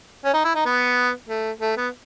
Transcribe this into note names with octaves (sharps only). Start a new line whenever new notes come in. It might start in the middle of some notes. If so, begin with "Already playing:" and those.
C#4
D#4
E4
D#4
B3
A3
A3
B3